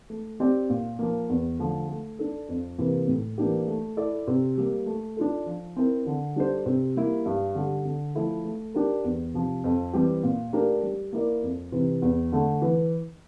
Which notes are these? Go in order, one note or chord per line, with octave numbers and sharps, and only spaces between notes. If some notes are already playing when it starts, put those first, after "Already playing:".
A3
C4 G4 D5
A#2
F3 A#3
E2
D3 F3 A3
A3
D4 A4
F2
C3 E3 A#3
A2
E3 A#3 D4 G4
A3
E4 A4 D5
C3
G3 A#3
A3
D4 F4 A4
F3
C4 E4 A#4
D3
G3 D4 A4 C5
C3
G3 A#3 E4
G2
D3 G3
D3
F3 A3 E4 A4
A3
D4 G4 A#4
E2
C3 F3
F2
E3 G3 C4 G4
A#2
A3 D4 G4 A#4
G3
A#3 E4 A#4 D5
F2
C3 E3
E2
D3 A3
E3